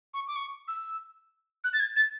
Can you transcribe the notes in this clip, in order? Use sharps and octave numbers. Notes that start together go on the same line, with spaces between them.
C#6
D6
C#6
E6
F#6
A6
G#6
A6